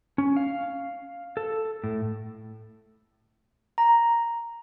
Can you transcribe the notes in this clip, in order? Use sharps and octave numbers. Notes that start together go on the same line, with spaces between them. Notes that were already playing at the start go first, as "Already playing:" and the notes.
C#4
F5
A4
A2
A#5